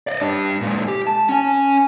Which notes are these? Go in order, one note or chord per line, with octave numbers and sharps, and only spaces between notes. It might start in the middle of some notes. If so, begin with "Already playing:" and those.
D5 D#5
G3 D4
A#2 G#3
G4
A5
C#4 G#5